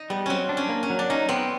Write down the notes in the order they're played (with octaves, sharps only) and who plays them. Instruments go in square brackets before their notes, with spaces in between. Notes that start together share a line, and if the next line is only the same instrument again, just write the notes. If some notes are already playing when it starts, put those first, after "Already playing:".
Already playing: [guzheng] D#4
[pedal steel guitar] G3 [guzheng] B3
[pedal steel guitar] F#3 [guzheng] C4 C#4
[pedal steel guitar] D4
[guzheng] C#4
[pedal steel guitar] A#3
[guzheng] C#4
[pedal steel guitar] F#3
[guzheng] D4
[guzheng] C#4 [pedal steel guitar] D#4
[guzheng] B3 [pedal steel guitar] C4